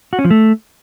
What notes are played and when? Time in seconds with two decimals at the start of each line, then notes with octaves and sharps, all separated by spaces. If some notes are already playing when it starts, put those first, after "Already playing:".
0.13 F#4
0.19 C#4
0.25 F3
0.31 A3